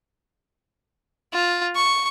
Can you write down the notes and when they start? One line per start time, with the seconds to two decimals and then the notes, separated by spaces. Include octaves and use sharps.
1.33 F4
1.76 C#6